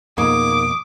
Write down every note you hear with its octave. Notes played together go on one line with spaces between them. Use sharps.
F2 B2 A#3 D#4 G#4 D6 D#6